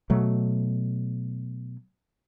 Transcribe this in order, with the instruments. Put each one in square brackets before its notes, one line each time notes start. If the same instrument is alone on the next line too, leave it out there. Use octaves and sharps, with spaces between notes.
[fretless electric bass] B2 F#3 A3